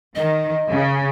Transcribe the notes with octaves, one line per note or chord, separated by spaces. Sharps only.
D#3 D#5
C#3